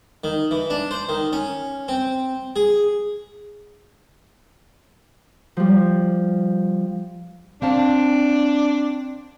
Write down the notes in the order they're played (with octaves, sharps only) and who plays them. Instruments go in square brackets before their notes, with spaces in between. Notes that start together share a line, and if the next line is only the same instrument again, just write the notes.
[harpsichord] D#3
E3
D4
C5
D#3
C#4
C4
G#4
[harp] F3 G3
[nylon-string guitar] C4 F5 A5 [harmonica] D4